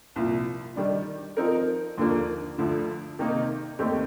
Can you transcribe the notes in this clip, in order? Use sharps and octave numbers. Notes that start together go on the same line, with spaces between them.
C2 A#2 F3
D#3 G3 D4
F3 C4 D#4 A#4
D#2 D3 F3 A#3
D2 D3 F3
C3 D#3 A#3 D#4
D#2 D#3 A3 C4 G4